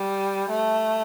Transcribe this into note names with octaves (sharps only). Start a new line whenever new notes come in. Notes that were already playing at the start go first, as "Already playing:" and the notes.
Already playing: G3
A3